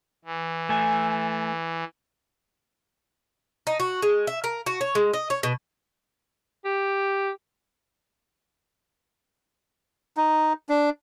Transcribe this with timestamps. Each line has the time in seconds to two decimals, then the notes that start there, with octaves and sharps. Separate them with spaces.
0.25 E3
0.69 A3 G#5
3.67 D#4
3.80 F#4
4.02 G#3
4.27 E5
4.44 A#4
4.66 F#4
4.81 C#5
4.95 G#3
5.14 D#5
5.30 C#5
5.43 B2
6.65 G4
10.17 D#4
10.69 D4